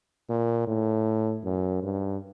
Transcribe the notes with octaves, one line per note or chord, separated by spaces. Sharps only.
A#2
A2
F#2
G2